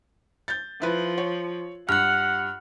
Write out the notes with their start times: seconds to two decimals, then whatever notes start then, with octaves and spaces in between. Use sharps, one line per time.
0.48 G6 A6
0.82 F3 E4 B4
1.18 C#5
1.89 G2 F#5 F6 F#6